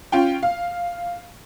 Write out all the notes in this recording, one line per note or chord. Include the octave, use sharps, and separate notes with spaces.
C#4 F4 G5
F5